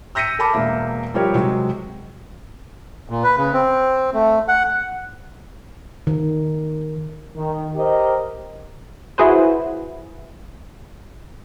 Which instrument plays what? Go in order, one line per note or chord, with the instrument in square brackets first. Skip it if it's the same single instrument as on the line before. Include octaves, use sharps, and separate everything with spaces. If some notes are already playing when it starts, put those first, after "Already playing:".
[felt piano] E6 G6 A#6 B6 C#7 D#7
A4 A#4 A5 B5 D6
E1 A#3 E5
F3 G3 G4 A#4 C#5
C3 F#3 G#3
[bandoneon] A#2
B4
C#3
C4
A3
F#5
[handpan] D#3
[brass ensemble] D#3
G4 A#4 C5 D#5
[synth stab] E4 F#4 G#4 B4 C5